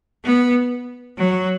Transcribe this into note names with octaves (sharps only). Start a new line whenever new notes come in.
B3
F#3